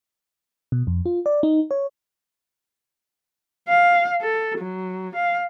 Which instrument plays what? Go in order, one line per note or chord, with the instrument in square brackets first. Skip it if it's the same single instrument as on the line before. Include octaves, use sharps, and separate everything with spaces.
[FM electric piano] B2
F2
F4
D5
D#4
C#5
[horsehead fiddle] F5
A4
F#3
F5